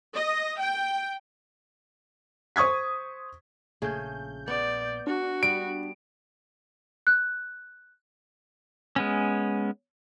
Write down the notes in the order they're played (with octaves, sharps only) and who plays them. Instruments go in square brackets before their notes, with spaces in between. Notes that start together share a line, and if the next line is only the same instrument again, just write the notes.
[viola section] D#5
G5
[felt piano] C5 C#6 D#6 G#6 B6
[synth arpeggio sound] A#1 G6 [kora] C#3 A3 G#4
[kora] B3 [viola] D5
[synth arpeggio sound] D4 [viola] F#4
[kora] G3 B3 [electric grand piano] D7
[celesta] F#6
[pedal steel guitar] G#3 B3 C#4